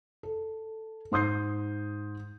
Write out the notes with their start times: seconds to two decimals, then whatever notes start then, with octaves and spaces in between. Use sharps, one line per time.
0.23 A4
1.12 G#2 C6 D#6 G6 C7